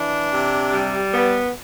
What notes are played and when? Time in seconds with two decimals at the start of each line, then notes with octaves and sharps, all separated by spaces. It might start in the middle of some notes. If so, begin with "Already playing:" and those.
Already playing: E3 D4
0.32 C3
0.72 G3
1.13 B3